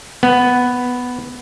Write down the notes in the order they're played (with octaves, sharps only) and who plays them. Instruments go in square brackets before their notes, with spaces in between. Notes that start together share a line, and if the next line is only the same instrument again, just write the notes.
[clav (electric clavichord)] B3